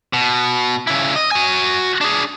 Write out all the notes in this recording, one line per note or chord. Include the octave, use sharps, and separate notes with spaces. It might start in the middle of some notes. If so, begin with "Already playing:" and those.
B2
C#3 E4
D#5
F#4 G#5
D4 G#4